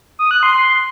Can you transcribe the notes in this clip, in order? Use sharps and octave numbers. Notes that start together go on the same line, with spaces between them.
D#6
F#6
C6